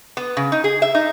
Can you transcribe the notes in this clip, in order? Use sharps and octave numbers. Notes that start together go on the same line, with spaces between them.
B3
C#3
D#4
G#4
E5
D#4